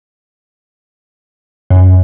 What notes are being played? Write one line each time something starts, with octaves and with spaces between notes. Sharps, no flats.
F#2